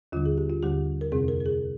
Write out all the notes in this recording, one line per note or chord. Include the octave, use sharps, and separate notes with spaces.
D#2 D3 G3 F4
G#4
G4
F4
D#2 D3 G3 G4
A#4
F2 C3 G3 C4 G#4
A#4
A#4
G#4